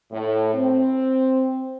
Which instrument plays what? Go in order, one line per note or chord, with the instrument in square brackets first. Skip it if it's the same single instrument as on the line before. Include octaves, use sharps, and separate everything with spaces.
[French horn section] A2
C4